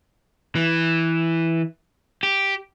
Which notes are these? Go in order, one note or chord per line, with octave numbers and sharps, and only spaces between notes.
E3
G4